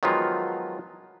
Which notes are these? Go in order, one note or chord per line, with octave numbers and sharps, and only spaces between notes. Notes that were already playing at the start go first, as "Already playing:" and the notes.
D#3 F3 F#3 G#3 B3 F4